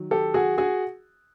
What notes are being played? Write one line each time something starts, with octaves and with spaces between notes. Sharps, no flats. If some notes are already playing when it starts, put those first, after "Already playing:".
Already playing: D#3 F#3
G4 A4
F#4 G#4
F#4 G#4